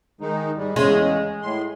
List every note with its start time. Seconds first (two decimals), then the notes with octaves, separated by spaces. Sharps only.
0.21 D#3 G#3 D#4
0.57 G#2 G3 G#3
0.76 E2 C#3 G#3 C#4
1.42 A2 C6